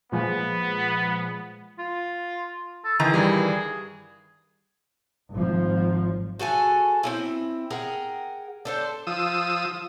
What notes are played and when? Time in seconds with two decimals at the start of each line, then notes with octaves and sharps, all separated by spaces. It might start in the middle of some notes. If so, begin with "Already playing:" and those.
0.12 A#2 F3 G#3 B3
1.79 F4
2.85 A4
3.00 D#3 E3 G#4 A#5
3.14 G2 G3
5.32 G#1 F3
6.39 F#4 G#4 A4 G#5
7.03 C4 C#4 E4
7.70 G#4 A#4 F#5 G5
8.65 D4 A4 C5
9.07 F3 D#6 E6